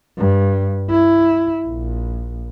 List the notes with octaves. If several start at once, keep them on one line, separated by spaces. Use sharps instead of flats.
G2
E4
A#1